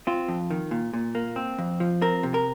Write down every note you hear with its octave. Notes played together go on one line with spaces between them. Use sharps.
C4 F4
F2
D#3
A#2
A#2
A#3
C4
F2
F3
C4 A#4
C3
A#4